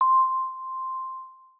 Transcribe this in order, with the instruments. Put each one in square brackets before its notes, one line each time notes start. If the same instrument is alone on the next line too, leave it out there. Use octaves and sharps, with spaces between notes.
[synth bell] C6